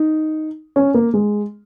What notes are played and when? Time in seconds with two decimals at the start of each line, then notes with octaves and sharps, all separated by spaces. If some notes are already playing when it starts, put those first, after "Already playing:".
Already playing: D#4
0.76 C#4
0.94 A#3
1.14 G#3